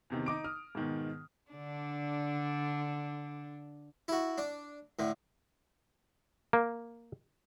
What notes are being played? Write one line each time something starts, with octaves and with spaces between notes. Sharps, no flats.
E2 C3 D#3
D#4 D6 D7
D#6 F6
G#2 B2 D#3
D3 D4
E4 F#4
D4
A2 D3
A#3